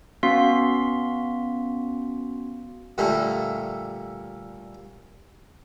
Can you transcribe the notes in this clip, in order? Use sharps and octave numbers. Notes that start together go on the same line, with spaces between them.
B3 C#4 F#4 F5 C6 B6
A#2 D3 G3 A3 A#3